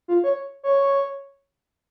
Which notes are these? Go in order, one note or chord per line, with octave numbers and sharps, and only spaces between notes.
F4
C#5
C#5